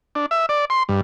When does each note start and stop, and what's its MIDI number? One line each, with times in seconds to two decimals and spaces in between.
0.15 0.26 62
0.31 0.46 76
0.49 0.65 74
0.70 0.83 84
0.89 1.01 43